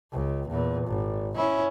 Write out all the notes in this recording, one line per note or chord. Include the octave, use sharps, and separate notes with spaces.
C#2
E2 A#2
G#1
C#4 E4